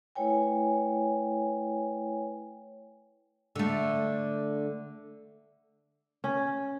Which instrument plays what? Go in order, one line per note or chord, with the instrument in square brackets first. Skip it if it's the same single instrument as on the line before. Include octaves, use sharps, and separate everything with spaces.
[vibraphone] A3 E4 B4 C#5 G5 G#5
[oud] D3 A3
[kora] C#4